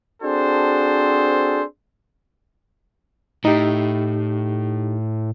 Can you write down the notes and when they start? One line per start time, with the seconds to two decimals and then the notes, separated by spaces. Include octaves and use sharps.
0.23 C4 D4 F#4 G#4 A4 C5
3.45 A2 D#4 G4